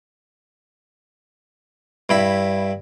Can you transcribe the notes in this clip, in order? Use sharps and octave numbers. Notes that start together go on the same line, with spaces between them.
G2 E4 B5